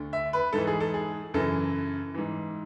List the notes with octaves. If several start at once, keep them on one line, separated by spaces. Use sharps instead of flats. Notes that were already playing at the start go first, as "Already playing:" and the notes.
Already playing: D2 D3
E5
B4
G#2 E3 A4
G#4
A4
G#4
F#2 C#3 E3 A4
G#2 E3